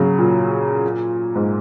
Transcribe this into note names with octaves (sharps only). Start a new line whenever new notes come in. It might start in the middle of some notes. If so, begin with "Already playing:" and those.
Already playing: C#3 F#3
A#2
G#2